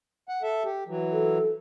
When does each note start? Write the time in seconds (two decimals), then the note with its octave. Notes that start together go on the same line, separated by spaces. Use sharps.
0.29 F#5
0.43 A4 E5
0.64 G4
0.88 E3 F#3
1.11 A4